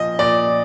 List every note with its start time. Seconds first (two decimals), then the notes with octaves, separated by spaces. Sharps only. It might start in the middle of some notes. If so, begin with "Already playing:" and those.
Already playing: A#2 F3 D#5
0.19 A#2 D5